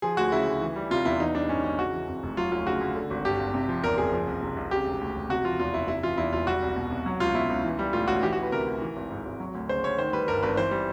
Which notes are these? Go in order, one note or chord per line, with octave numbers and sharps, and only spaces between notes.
F3 G#4
D2 F#4
C#3 E4
D2
E3
G3
C3 F4
E2 E4
E3 D#4
G3 D4
G#2 C#4
G#1 C#4
C#3 F#4
E3
F2
F1
F#3 F4
D2 F4
C#3 F#4
D2
D3
G#1
G2 G4
G#1
C3
F3
E2 A#4
F#1 G#4
F3
C2
C3
C2
C#3 G4
E1
D2
E1
C3 F#4
F3 F4
E2 F4
F#1 E4
C3 E4
E3 F4
E2 E4
E1 F4
G3 F#4
C2
B2
C2
F#3
C#2 F4
B2 E4
C#2
E3
G3
A2 F4
A1 F#4
E3 G4
F#4
D2 B4
C3 A#4
D2
E3
G#1
G#2
G#1
F#3
D2
C#3 C5
D2 C#5
D#3 C5
G3 B4
G2 A#4
G#1 B4
E3 C5
G3